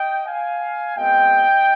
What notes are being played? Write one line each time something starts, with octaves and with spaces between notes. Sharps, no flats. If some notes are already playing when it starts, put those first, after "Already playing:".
Already playing: D#5 G5
F5 G#5
B2 G#3 C4 D#5 G5